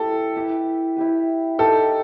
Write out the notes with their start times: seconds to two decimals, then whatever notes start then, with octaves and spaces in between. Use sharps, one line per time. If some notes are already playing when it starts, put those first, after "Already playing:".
Already playing: E4 G4 A4 B4
0.36 E4 G4 B4
0.96 E4 G4 B4
1.59 D#4 G4 A4 A#4 D#5